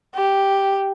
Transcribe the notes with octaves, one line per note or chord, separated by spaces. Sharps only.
G4